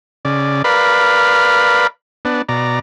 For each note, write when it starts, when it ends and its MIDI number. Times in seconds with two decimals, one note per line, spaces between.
0.25 0.62 49
0.25 0.62 74
0.64 1.87 70
0.64 1.87 71
0.64 1.87 74
0.64 1.87 77
0.64 1.87 83
2.25 2.42 59
2.25 2.42 62
2.49 2.79 47
2.49 2.79 74
2.49 2.79 82